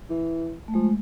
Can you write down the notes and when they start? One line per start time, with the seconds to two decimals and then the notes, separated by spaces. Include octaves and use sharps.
0.09 E3
0.68 A3
0.74 F3 G#3